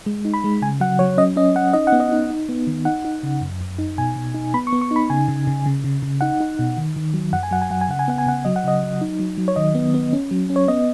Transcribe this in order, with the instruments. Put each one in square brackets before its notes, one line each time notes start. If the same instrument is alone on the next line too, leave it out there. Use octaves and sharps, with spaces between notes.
[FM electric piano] G#3
D#4
B5
G#3
C#3 G#5
F#3 F#5
F#3 C#5
C#4 D#5
C#4 D#5
C#4 F#5
D#4 D#5
F#5
B3
D#5
D#4
D#4
B3
D#3
D#4 F#5
D#4
C#3
F#2
F#2
D#4
B2 G#5
B2
D#4
B3 B5
C#6
B3
C#6
D#4
B5
C#3 G#5
C#3
C#3
C#3
C#3
C#3
D#4 F#5
D#4
B2
D#3
D#3
F#3
F#2 F#5
G#5
F#3 F#5
G#5
F#3 F#5
G#5
C#3 F#5
G#5
B3 F#5
G#5
C#3 F#5
F#3 D#5
F#5
C#3 D#5
F#3
D#4
F#3
F#3
C#5
D#3 D#5
B3
B3
C#4
F#3
C#4
C#5
B3 D#5